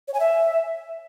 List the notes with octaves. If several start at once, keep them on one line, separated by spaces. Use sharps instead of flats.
C#5
G#5
E5